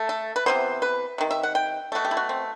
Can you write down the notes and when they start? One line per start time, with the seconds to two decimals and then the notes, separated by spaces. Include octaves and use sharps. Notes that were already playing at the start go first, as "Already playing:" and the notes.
Already playing: A3
0.09 A4
0.36 B4
0.46 C3 E3 B3 C5
0.82 B4
1.18 C3 D#3
1.31 E5
1.43 F#5
1.55 G5
1.92 B2 A3 F#4
2.05 G4
2.11 E4
2.17 F#4
2.29 C4